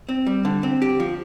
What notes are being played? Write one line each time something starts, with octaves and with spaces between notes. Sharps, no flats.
C4
G3
D3
C4
G4
F3